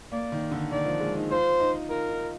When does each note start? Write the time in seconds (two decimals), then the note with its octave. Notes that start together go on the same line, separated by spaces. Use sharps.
0.12 A#3 D5
0.32 D#3
0.51 D3
0.71 D#3 D5
0.86 F3
1.01 G#3
1.16 D#4
1.31 F4 C5
1.60 D#4
1.90 F4 A#4
2.09 D#4